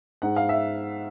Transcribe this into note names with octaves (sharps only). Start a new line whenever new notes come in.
G#2 F#5
F5
E5